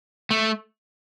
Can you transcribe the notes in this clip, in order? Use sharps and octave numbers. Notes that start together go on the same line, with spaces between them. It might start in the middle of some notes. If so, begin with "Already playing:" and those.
A3